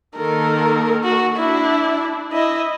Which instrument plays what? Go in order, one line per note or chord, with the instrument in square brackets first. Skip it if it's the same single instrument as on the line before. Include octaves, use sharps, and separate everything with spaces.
[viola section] D#3 A#3 A4 [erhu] A#4
[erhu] F#4
[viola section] D4 [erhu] E4
[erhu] E4 [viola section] D#5